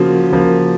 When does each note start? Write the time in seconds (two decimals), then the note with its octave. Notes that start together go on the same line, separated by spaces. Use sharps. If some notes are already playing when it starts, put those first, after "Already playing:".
Already playing: C#3 F3 A#3 F#4
0.32 C#3 F3 A#3